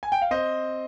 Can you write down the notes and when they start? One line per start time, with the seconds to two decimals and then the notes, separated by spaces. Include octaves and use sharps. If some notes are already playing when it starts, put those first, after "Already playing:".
0.03 G#5
0.12 G5
0.22 F5
0.31 C4 C5 D#5